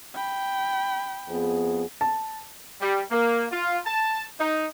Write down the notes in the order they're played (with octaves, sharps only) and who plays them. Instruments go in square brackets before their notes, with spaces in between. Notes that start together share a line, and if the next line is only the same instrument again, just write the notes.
[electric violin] G5 B5
[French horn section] F2 B3 G#4
[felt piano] A5
[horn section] G3
A#3
F4
A5
D#4